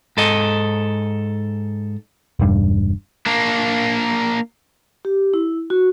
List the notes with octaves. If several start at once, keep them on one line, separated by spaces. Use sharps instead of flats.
G#2 A4 D#5
E1 G2
A#3 D4
G4
E4
F#4